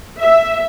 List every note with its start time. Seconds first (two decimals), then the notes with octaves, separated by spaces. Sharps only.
0.20 E5